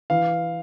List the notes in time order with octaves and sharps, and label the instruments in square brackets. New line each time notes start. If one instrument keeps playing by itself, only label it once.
[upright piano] E3 [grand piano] F5